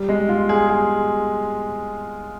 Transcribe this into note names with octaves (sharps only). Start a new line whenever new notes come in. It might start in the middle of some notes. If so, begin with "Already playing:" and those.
Already playing: G3
G#3
F4
G#4
G#4